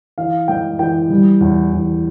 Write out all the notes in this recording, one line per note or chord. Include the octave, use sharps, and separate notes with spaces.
E3 F5
G#3 G5
E3 G5
G3
E2
E2